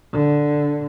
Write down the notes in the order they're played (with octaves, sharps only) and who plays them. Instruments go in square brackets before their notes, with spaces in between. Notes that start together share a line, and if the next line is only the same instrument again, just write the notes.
[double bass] D3